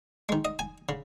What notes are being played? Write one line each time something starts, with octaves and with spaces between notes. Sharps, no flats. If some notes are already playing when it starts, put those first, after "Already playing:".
D#3 G#3
D#5
G#5
C#3